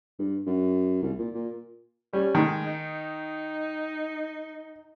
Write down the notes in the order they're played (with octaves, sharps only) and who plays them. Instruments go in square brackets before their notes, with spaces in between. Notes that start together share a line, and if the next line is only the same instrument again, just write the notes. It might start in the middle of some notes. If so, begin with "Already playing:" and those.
[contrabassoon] G2
F#2
C2
A#2
A#2
[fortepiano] G3 [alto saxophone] C#4
[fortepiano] D#3 [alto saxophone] G#3
[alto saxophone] D#4